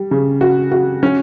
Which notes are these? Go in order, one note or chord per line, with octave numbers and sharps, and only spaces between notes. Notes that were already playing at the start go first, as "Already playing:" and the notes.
Already playing: G3
C#3
F#4
F#4
C#4